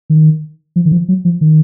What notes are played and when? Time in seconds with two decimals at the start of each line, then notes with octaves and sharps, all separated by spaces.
0.10 D#3
0.76 F3
0.85 D#3
0.92 F3
1.09 F#3
1.25 F3
1.41 D#3